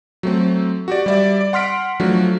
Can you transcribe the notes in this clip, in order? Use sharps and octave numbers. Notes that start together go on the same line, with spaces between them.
F#3 A3 C4
F#4 G4 D5
G3 D5 E5
D5
F#5 C6 F6 B6 D7
F3 F#3 A3 D4 F#4